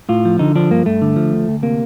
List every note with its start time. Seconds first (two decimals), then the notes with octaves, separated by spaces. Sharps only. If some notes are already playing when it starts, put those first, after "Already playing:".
0.09 A2 F4
0.25 F3
0.39 D3 D#4
0.55 F3 D4
0.71 G2 A#3
0.85 G2 A3
1.02 D3
1.16 F3
1.32 D2
1.48 D2
1.62 C3 A#3